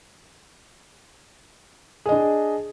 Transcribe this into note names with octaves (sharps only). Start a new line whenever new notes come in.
D4 G#4 D#5